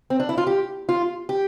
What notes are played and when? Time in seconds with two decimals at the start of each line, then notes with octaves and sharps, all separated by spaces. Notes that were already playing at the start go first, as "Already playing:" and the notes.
0.10 C4
0.20 D4
0.29 E4
0.38 F4
0.47 G4
0.89 F4
1.29 G4